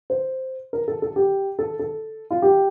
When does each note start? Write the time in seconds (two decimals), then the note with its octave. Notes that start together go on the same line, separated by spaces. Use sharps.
0.10 C5
0.73 A#4
0.88 A4
1.02 A4
1.16 G4
1.59 A4
1.79 A4
2.30 F4
2.42 G4